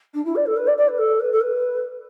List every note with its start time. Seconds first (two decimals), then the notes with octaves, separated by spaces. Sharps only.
0.14 D4
0.25 E4
0.35 D5
0.46 A4
0.56 B4
0.67 D5
0.77 D5
0.88 B4
0.98 A4
1.19 B4
1.32 A4
1.41 B4